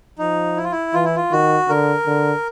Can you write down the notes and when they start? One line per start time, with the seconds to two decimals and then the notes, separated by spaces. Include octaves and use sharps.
0.18 F3 D#4
0.57 E4
0.64 F4
0.72 E4
0.94 E3 F4
1.05 E4
1.16 F4
1.32 D#3 F#4
1.69 D3 A#4
2.06 D3